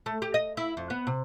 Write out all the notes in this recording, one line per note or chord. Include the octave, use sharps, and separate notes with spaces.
A3
G4
D#5
E4
F2
B3
C3